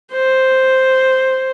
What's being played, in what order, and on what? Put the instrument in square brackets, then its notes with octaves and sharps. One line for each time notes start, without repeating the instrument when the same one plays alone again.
[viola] C5